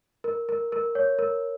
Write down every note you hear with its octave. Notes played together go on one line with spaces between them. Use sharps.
A#4
A#4
A#4
C#5
A#4